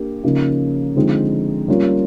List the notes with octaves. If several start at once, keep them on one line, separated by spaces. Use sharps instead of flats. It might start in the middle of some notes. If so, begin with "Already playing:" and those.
Already playing: A#3 D4 G4
C#3 F3 A#3 D#4
D3 F3 G#3 C4 D#4
G3 A#3 C#4 F4